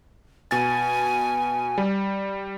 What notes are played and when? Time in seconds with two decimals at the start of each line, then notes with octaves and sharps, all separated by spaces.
0.51 B2 G#5 A6
1.78 G3